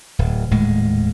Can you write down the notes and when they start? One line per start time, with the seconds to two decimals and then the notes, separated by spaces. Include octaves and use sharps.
0.19 D1
0.51 D#1 A2 G#3